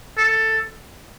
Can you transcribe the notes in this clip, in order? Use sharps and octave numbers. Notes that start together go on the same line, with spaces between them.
A4